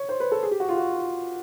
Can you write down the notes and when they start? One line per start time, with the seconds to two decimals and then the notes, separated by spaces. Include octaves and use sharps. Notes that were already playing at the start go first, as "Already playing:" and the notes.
Already playing: C#5
0.09 C5
0.20 B4
0.32 A4
0.43 G#4
0.51 G4
0.60 F#4
0.68 F4
0.77 F#4